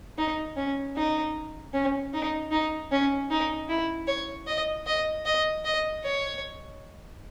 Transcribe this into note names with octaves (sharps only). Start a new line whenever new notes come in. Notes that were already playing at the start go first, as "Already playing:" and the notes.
D#4
C#4
D#4
C#4
D#4
D#4
C#4
D#4
E4
C#5
D#5
D#5
D#5
D#5
C#5